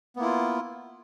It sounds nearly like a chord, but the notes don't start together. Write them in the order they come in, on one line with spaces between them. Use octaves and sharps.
B3 A#3 E4 F4